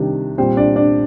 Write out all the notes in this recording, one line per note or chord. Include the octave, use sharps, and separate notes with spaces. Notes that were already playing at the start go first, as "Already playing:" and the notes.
Already playing: C3 D#3 G3 D4
A#2 G3 C4 C5
D4 D5
D4 D5